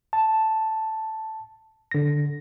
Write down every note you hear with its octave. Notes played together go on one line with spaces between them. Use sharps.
A5
D3 A#6